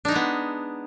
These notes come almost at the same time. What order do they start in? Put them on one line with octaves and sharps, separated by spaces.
D4 D#4 G#3 B3